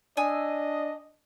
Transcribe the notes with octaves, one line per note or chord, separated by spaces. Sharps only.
D4 D#5 G#5 D#6 E6